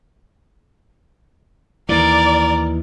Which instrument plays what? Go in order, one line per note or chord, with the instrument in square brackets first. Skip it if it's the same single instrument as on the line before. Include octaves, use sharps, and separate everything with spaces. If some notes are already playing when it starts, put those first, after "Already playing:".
[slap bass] D#2 E3 [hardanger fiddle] A#4 [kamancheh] D5